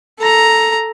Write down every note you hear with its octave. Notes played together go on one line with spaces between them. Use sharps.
A4 A#5